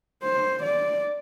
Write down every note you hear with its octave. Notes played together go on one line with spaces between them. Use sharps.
C5
D5